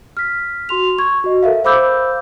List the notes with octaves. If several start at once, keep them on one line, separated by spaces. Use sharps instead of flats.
F6 B6
F#4 C6 F7
C#6 G#6
F#4 D#5
A4 A#4 E5 F5
C5 F5 B5 D6 E6 G6